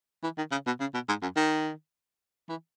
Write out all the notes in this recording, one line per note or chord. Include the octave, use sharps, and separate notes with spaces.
E3
D#3
C#3
B2
C#3
B2
G#2
F#2
D#3
E3